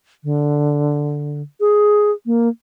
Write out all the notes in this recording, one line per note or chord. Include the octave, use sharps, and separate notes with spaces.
D3
G#4
A#3